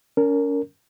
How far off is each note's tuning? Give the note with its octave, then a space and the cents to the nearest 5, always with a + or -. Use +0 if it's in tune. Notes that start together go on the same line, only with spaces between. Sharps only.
C#4 +35 A#4 -15